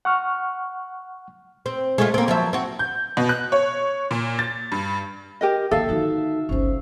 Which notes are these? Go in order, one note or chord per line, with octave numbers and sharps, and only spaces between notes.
F#5 C#6 F6
C4
G#3 A3 F4
A#3 C4
F3 F#3 E5
C4 F#4
G6
B2
F#6
C#5
A#2
A6
G2
G4 A#4 D#5 G5
D#2 D3 A4 E5 F5
D3 D#3 D#4 F#4
G1 C#2 C#4 C5